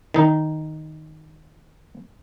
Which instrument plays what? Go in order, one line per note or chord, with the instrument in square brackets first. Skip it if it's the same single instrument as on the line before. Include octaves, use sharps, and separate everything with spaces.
[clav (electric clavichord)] D#3 D#4